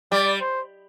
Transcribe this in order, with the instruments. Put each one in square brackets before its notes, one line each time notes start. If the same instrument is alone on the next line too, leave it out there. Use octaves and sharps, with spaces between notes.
[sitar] G3 [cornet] D5
[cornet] C5